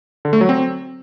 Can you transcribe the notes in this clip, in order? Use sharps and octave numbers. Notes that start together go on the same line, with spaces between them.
D3
A3
F#3
C4